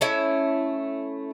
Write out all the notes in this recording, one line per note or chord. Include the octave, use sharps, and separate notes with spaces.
A3 C#4 E4